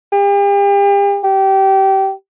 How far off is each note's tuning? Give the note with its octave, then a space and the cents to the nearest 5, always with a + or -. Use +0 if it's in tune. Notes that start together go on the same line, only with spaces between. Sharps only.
G4 +40
G4 -20